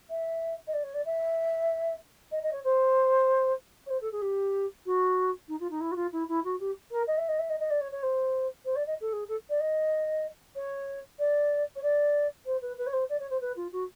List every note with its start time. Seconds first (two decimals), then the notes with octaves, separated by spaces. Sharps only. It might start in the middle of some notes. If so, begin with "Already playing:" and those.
0.10 E5
0.67 D#5
0.74 D5
0.83 C#5
0.94 D5
1.06 E5
2.32 D#5
2.43 D#5
2.53 C#5
2.64 C5
3.86 C#5
3.90 C5
4.01 A4
4.12 G#4
4.22 G4
4.86 F#4
5.48 D#4
5.60 F4
5.70 D#4
5.80 E4
5.92 F#4
5.96 F4
6.12 E4
6.29 E4
6.44 F#4
6.60 G4
6.91 A#4
7.07 D#5
7.18 E5
7.28 D#5
7.39 E5
7.50 D#5
7.60 D#5
7.70 D5
7.81 C#5
7.92 C#5
8.03 C5
8.65 C5
8.76 D5
8.87 D#5
9.01 A4
9.13 G#4
9.28 A4
9.49 D5
9.60 D#5
10.56 C#5
11.19 D5
11.76 C#5
11.83 D5
12.46 C5
12.62 B4
12.78 B4
12.87 C#5
12.93 C5
13.09 D5
13.20 C#5
13.30 C5
13.41 B4
13.56 F4
13.72 F#4